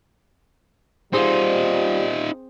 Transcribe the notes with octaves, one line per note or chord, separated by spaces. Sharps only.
G3 C4 D#4 F4 G#4 C5